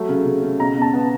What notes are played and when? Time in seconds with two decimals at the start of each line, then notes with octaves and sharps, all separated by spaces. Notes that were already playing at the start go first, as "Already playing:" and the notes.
Already playing: F#3 A3
0.09 C#3
0.25 C#3
0.43 C#3
0.59 B2 A#5
0.77 B2 A5
0.94 B3